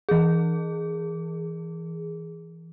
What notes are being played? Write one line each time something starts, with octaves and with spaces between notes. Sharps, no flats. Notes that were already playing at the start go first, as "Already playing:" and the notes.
E3 G#4